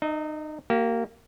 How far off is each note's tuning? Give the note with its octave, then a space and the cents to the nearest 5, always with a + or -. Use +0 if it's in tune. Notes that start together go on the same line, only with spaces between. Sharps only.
D#4 -30 D#5 +40
A#3 -15 G4 -40